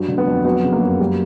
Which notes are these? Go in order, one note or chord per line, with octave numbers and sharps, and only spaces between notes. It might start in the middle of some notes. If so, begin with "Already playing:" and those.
Already playing: G2 F#3
D3
B3
F2
F#3 B3
C#3
A#3
F#2
G3